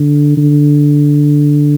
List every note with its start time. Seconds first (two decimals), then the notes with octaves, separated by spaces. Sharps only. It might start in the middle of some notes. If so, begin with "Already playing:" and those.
Already playing: D3
0.37 D3